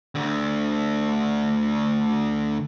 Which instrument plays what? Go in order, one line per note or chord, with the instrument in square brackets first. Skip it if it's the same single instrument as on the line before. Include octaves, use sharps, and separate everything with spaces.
[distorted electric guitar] D2 D3